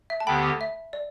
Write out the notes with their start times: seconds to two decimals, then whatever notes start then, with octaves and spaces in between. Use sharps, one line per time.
0.10 E5
0.20 A5
0.27 D2 D3 B3 G4 G5 B5
0.61 E5
0.93 D5